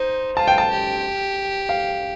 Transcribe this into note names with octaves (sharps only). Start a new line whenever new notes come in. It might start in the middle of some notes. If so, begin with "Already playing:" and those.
Already playing: D#4 C5
F4 A5
G5
A5
G4
F5